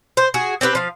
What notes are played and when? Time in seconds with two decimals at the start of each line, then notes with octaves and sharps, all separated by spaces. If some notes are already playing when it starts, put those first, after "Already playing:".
0.17 C5
0.34 F#4 G#4
0.61 C4 G4 G#4 B4
0.75 F3 F5